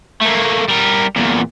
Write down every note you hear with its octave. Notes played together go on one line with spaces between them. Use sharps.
A3 A#3
G3 A#4
E2 A#2